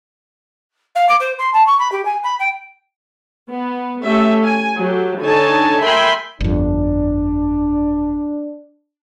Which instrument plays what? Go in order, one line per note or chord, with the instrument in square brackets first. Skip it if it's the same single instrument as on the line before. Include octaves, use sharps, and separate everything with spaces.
[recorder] F5
D6
C5
C6
A5
C#6
B5
G4
G#5
B5
G5
[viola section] B3
A3 C#4 G4 A4 E5
G#5
F#3 G4 A4
D3 D#4 C#5 G#5 A5
A#4 E5 G5 G#5 B5 C6
[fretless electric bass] G1 F2 [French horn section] D4